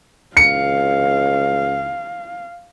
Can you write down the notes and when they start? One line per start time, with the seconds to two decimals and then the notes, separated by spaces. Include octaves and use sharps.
0.37 C#2 F5 C#7